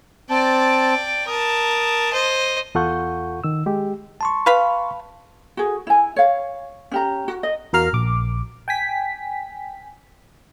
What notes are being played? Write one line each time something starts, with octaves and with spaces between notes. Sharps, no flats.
C4 D5 G5 A5
A#4 A5 D#6
C5 D#5
E2 F4 A4 F#5 C#6 G6
D#3 E6
G#3 G4
A5 C6 C#6
B4 F5 B5
F#4 G#4
E4 G#5
C#5 F5
C#4 G4 A#5
F#4
D#5
E2 F#4 A#4 F5 A#5 F6
A#1 D6
G5 G#5 B6